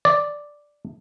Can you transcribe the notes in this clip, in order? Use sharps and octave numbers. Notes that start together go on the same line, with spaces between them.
D5